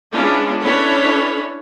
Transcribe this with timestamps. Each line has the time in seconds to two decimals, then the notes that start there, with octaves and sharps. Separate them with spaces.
0.11 G#3 B3 C#4 D4 E4 F4
0.64 C#4 D4 E4 A4 B4 C#5